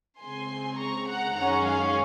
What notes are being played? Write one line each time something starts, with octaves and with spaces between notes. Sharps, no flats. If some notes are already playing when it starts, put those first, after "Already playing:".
C#3 G#3 C4 G#5 C6
A#5 C#6
F#5 A#5
F#2 D#3 G#3 C#4 F#5 A#5
F5 G#5